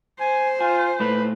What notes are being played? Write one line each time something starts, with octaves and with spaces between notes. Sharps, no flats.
C5 G#5
F4 G#5
A#2 A3 B4